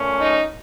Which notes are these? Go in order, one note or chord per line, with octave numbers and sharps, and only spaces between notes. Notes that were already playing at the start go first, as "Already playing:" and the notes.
Already playing: A#2 A3 C#4
D#4